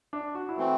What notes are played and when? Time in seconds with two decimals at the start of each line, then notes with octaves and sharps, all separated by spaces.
0.13 D4
0.35 F#4
0.49 E4
0.56 E3 A3 C4 F#4